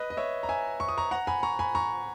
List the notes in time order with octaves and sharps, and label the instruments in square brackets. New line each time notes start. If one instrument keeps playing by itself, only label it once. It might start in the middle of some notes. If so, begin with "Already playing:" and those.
Already playing: [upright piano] B4 D#5
D#5
C#5 E5
A#5
E5 G#5
C#6
D#6
A#5 C#6
F#5 A#5
G#5 B5
A#5 C#6
G#5 B5
A#5 C#6